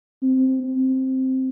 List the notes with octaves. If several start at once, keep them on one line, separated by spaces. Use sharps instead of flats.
C4
C4